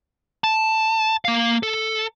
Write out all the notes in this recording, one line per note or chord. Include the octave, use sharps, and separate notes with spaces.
A5
A#3 F5
A4